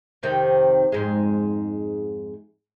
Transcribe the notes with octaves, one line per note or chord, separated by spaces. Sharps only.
F2 C3 D#3
F2 G#2 G#3